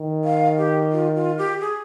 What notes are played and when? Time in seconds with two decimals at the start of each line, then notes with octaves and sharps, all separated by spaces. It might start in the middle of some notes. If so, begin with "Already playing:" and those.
Already playing: D#3
0.24 F5
0.58 G4
0.92 F4
1.15 F4
1.38 G4
1.60 G#4